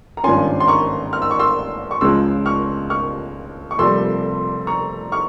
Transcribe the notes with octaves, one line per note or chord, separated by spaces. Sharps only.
A#5
G#1 G2 F3 A#3 C#4 G#5 C6
C6
A#5 C#6
F6
E6
C#6
C6 E6
C#6
C#2 C#3 F3 G#3 C6 E6
C#6 F6
C#6 F6
C#6
F1 F2 C3 G3 A#3 C6 E6
A#5 C#6
C#6 F6